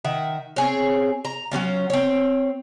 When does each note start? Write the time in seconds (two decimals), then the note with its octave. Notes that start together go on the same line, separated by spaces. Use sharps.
0.05 D#3 E5 F#5
0.56 C4 G#4 C#5
1.25 A#5
1.52 F#3 G3 C#4 F4
1.90 C4 C#5